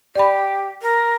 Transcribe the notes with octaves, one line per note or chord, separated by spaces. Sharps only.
G4 D5 B5
A#4